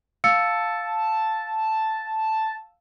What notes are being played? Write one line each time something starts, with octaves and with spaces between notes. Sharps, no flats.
F5 A5 E6 C#7